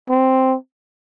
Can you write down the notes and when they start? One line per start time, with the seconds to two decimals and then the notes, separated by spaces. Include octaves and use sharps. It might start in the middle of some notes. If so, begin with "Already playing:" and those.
0.09 C4